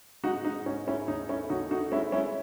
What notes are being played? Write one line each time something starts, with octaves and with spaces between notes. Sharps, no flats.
G#2 D#4 F#4
G#2 D#4
G#2 C#4
G#2 C#4 E4
D#2 D#4
A3 C#4 E4
D#2 D#4 F#4
A3 D#4 F#4
G#3 C#4 E4
G#3 C#4 E4